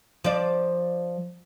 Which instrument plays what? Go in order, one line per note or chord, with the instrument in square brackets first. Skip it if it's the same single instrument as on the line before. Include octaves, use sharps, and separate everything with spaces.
[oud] F3 D5